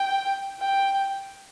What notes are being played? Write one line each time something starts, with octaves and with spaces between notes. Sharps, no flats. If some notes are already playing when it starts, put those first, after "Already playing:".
Already playing: G5
G5